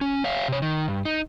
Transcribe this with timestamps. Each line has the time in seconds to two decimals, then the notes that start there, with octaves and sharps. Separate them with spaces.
0.01 C#4
0.24 C#5 E5 F5
0.48 C3 C#5
0.62 D#3
0.88 G2
1.05 D#4